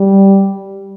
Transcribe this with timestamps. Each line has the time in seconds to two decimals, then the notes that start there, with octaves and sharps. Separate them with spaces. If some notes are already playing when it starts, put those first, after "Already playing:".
Already playing: G3